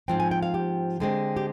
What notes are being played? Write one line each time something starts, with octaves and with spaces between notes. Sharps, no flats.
G#2 F3 C4 G5
G#5
G5
F5
G4
D3 G#3 C4
G4